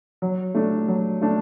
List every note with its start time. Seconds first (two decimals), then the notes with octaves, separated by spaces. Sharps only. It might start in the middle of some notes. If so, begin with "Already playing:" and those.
0.22 F#3
0.54 A3 D4
0.88 F#3
1.21 A3 D4